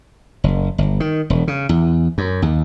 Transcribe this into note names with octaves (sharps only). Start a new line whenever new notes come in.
F#1
G1
D#3
E1
C#3
E2
F#2
D#2